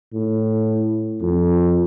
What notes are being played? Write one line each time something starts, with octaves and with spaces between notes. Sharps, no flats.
A2
F2